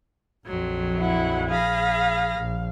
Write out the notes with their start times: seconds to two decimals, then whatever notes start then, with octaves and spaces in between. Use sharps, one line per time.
0.47 A#1 F2 F#3
0.99 E4 F#5
1.50 G#4 F5 B5 A#6
2.38 A#1